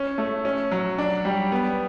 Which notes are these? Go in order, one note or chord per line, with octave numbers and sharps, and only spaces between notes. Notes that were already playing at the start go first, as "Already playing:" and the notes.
Already playing: C#4
A3
C#4
F#3
D4
G3
B3